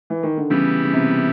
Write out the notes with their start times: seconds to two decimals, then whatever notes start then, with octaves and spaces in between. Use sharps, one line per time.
0.10 E3
0.23 D#3
0.37 D3
0.50 C#3 E3 G3 B3
0.84 C#3
0.93 C3